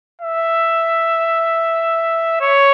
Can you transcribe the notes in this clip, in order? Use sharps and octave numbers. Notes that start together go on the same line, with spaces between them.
E5
C#5